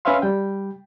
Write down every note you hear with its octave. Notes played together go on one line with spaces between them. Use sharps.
C#4 B4 C#5 E5 F5 C6
G3 G5